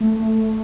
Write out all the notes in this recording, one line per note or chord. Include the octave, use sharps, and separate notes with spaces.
A3